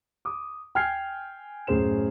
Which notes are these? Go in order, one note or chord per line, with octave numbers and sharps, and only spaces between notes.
D6 D#6
G5 G#5 F6 G6 G#6 C7
F#2 A2 G#4 C5 E7